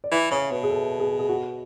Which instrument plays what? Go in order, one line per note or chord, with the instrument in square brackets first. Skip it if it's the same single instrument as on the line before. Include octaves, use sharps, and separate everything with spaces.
[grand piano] D5
[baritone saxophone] E3 [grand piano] E5
[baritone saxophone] C#3 [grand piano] C#5
[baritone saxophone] B2 [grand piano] B4
[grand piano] G#4
A4
G#4
G#4
F#4